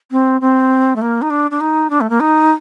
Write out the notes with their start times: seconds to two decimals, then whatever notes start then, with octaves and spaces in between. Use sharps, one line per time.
0.11 C4
0.41 C4
0.96 A3
1.02 A#3
1.22 D#4
1.30 D4
1.51 D4
1.60 D#4
1.90 D4
2.01 A3
2.10 A#3
2.20 D#4